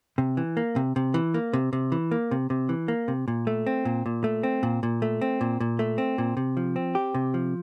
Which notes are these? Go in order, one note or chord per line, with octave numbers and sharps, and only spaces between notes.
C3
E3
A#3
C3
C3
E3
A#3
C3
C3
E3
A#3
C3
C3
E3
A#3
C3
A#2
A3
C4
A#2
A#2
A3
C4
A#2
A#2
A3
C4
A#2
A#2
A3
C4
A#2
C3
F3
C4
G4
C3
F3